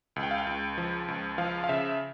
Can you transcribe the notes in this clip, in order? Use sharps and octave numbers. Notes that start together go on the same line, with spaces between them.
C#2
G5
F5
G5
C#2
F3
C#2
F3 F5
F5
C#3 E5